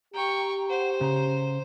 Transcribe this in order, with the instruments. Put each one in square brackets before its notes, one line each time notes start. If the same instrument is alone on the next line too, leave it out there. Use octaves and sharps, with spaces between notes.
[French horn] G4 [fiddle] G5 C#6 [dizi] A#5
[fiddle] C5 [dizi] F#5
[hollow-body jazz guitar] C#3 [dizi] A#5